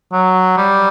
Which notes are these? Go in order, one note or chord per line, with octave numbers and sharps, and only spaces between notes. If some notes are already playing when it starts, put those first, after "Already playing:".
F#3
G3